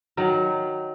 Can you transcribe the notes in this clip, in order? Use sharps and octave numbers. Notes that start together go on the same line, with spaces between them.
D#3 F#3